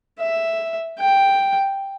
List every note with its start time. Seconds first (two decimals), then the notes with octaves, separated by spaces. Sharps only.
0.20 E5
0.99 G5